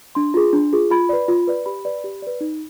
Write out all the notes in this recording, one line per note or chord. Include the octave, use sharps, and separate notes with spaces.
D4 C6
F4 G#4
D4
F4 G#4
F4 B5
B4 D5
F4
B4 D5
G4 B5
B4 D5
G4
B4 D5
D#4